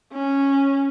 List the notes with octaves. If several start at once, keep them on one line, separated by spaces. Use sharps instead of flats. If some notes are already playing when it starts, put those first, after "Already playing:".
C#4